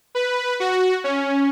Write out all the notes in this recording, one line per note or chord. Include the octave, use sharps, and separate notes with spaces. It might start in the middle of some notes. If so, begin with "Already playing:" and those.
B4
F#4
C#4